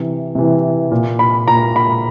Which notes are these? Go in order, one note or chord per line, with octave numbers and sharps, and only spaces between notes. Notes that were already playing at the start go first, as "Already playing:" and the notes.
Already playing: C3 E3
C3 E3
A#2
B5
A#2 A#5
B5